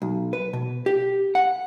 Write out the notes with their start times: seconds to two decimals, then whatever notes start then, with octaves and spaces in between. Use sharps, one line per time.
0.02 B1
0.33 B4
0.53 B2
0.86 G4
1.35 F#5